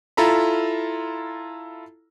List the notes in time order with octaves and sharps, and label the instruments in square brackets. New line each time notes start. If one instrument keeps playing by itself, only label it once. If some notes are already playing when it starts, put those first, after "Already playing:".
[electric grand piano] E4 F4 A4 A#5 B5